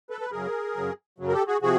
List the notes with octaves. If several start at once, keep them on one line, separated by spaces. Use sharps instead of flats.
A4 B4
B4
F#2 C#3 F#3 G#4 A#4
F#2 C#3 F#3
F#2 C#3 F#3
A#4
G4 A4
F#4 G#4
C3 F3 F#4 G#4